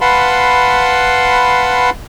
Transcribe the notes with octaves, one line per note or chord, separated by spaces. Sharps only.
B4 F5 F#5 A5 B5 C6